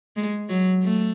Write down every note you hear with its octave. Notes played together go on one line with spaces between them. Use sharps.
G#3
F#3
A3